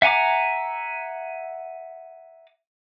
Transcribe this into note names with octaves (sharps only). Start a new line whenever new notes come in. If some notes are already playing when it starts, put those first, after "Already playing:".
E5 F#5 G#5 A#5 D6